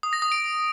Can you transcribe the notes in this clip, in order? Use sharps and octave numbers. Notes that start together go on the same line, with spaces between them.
D#6
A#6
D#6
D7